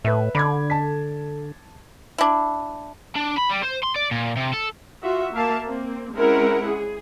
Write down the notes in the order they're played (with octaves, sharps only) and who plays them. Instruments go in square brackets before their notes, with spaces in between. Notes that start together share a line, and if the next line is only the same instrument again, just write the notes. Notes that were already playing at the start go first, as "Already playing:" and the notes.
[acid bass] A2 [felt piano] B4 E5
[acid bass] D3 [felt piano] B5 D6 G#6
[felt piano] A5 B6
[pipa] D4 E4
[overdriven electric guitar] D4
B5
G3
C5
C6
D5
A#2
C3
A4
[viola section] F4 F#4 E5
A#3 A#4 E5 F5 A5
A#3 C4
G#3 C4 C#4 E4 A#4 F#5
G#4